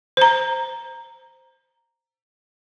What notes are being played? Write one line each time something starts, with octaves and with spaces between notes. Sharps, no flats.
C5 A#5